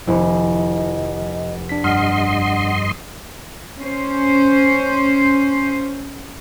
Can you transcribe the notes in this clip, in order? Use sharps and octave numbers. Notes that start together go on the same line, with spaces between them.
F1 D#3 F3 E4 D#5
D4 B6
G2 D#5 F#5 C6 F6
C#4 C5